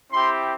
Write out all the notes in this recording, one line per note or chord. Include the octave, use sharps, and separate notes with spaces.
C4 E4 G4 C6